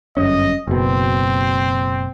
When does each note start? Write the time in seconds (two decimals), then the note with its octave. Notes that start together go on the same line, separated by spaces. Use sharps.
0.17 G1 F#2 C#4 D#5
0.68 F#1 B2 C4